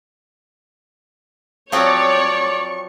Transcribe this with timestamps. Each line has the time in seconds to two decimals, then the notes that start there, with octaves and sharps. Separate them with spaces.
1.72 F3 F#3 C4 C#5 D5 C#6